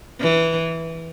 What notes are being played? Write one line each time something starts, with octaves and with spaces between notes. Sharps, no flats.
E3